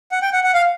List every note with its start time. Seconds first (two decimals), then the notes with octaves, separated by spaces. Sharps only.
0.12 F#5
0.22 G5
0.33 F#5
0.44 F#5
0.54 F5